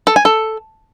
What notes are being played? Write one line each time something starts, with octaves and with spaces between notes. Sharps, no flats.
A4
G#5
A4